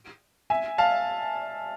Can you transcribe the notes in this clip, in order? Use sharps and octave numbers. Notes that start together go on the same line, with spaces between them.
E5 G#5
F5 A5